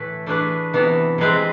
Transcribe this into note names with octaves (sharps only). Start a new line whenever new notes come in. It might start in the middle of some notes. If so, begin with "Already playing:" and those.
Already playing: A2 E3 A3 E4 B4
E3 A3 D4 G#4 B4
C3 E3 B3
C3 G#3 C4 G#4 B4